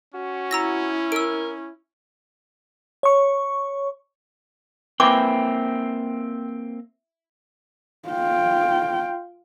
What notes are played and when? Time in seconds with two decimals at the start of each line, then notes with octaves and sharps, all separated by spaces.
0.14 C#4 F#4
0.51 E4 A#5 E6 A#6
1.12 A#4 E6 D7
3.03 C#5 C#6
5.00 E3 A#3 C4 G5 D6
8.09 F4 G5